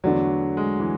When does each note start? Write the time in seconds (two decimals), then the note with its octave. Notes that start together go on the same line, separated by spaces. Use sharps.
0.04 E2 D3 F#3 A3 D4 F#4
0.57 G#3
0.80 E3